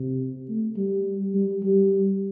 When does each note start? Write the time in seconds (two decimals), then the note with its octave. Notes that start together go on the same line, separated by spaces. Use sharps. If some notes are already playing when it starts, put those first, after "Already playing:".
Already playing: C3
0.49 A3
0.77 G3
1.35 G3
1.63 G3